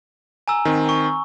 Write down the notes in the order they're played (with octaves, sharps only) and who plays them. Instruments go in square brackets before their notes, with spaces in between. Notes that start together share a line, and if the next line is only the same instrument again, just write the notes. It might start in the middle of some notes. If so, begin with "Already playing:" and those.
[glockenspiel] G#5 A#5 E6
[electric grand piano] D#3 C4
[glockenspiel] C#6